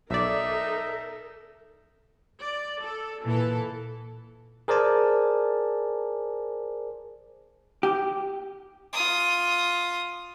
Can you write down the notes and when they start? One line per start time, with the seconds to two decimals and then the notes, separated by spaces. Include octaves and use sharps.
0.11 B1 D#4 A4 A#4 D5 E5
2.40 D5
2.83 A4
3.25 A#2 E3 A4
4.68 G#4 A#4 C5 D5 G#5 A5
7.83 G4
8.93 F4 D#6